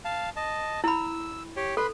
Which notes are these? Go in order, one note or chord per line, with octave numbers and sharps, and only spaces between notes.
F5 A5
D#5 A5
E4 B5 E6
G4 C#5 G5
A4 B4 B5 C6